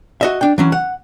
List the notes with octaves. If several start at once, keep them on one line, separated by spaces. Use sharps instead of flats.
F#4 D#5 E5
D4 G5
E3 F#3 C#4
F#5